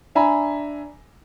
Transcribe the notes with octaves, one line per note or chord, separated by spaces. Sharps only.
D4 E5 G#5 A#5 B5